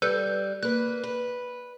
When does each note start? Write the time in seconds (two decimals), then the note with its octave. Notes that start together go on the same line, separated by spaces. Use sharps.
0.02 G3 A4 B4 G6
0.63 A#3 B4 F#6
1.03 B4